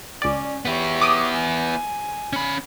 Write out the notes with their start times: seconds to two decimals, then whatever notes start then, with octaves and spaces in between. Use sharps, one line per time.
0.22 C#2 C#4 D5
0.65 B3 E4 G4 C#5
1.02 D6 D#6
1.34 G#5
2.33 C#4 B5